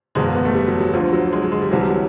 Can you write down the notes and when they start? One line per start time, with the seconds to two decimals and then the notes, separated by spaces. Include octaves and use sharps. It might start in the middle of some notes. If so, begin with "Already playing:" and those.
0.15 F#1 E2 B2 G#3
0.25 A#3
0.35 B3
0.45 A3
0.54 G3
0.68 F#3
0.81 F#3
0.93 D2 D3 F3
1.13 F#3
1.33 G#3
1.42 F#3
1.52 G#3
1.62 G3
1.71 C2 C3 E3 F#3
1.81 G3
1.90 F#3